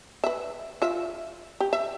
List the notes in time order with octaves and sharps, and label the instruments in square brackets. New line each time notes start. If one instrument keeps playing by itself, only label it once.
[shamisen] B4 E5
F4 E5
G4
E5